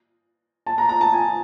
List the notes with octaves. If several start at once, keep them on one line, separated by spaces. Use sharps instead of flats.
A5
A#5
A#5
A5
G#5